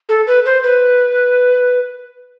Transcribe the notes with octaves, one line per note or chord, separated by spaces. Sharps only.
A4
B4
C5
B4